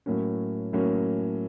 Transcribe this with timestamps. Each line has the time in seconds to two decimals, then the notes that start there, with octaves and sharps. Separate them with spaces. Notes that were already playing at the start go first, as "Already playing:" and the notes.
0.06 A2 F#3 A#3 C#4
0.73 A2 F#3 A#3 C#4